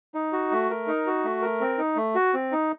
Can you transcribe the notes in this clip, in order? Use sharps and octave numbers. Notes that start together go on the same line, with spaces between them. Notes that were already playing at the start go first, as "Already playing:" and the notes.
D#4
F#4
A3
A#4
D#4
F#4
A3
A#4
C4
D#4
A3
F#4
C4
D#4